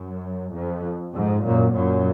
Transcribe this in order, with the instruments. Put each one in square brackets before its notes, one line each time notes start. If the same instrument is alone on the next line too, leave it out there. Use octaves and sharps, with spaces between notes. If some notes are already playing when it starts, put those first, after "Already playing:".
Already playing: [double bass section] F#2
F2
F2 G#2
F#2 A#2
F#2 A#2